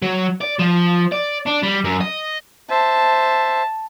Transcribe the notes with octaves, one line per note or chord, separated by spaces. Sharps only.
F#3
D5
F3
D5
D4
G3
F#2
D#5
C5 E5 A5